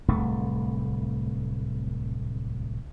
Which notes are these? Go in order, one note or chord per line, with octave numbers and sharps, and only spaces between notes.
D1 C2 A3